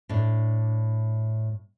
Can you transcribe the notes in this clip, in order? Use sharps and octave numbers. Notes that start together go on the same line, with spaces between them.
A2 D4